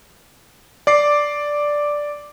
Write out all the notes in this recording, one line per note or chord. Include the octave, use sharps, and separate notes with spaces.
D5 D6 C7